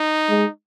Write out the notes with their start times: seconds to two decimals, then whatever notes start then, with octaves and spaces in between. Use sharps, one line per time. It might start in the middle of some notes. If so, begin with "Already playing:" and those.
Already playing: D#4
0.29 G#3